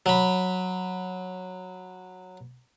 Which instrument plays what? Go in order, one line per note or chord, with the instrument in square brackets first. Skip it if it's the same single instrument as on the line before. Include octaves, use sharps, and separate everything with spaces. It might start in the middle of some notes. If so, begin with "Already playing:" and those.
[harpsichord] F#3 B5